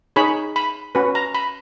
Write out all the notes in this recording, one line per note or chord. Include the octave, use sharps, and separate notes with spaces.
D#4 G#4 C#5 B5
B5
C#4 F#4 B4
A#5
B5